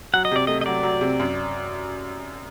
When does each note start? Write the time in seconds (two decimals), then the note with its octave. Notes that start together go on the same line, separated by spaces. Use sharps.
0.13 F#3 F#5
0.25 D#5
0.31 C3 D5
0.47 A3 D#5
0.61 D#5
0.66 F#3 D5
0.83 F#3
1.01 C3
1.20 F#2